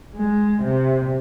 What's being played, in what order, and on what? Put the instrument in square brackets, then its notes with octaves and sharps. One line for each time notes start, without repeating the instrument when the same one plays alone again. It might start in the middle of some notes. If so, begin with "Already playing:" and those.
[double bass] G#3
C3